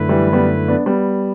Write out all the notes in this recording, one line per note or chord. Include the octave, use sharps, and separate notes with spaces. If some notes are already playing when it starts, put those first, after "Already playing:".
Already playing: F#2 D3 A3 E4 B4
E3 G3
G3 B3
B3 D4
G3 B3